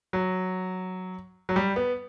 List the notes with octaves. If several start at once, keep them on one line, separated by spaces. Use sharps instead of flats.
F#3
F#3
G3
B3